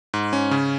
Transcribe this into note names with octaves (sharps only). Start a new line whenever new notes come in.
G#2
C#4
C#3